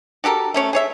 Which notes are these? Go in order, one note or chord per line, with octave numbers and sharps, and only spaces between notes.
F#4 G4 A4 A#4
A3 C#4 C#5
G#4 C#5 E5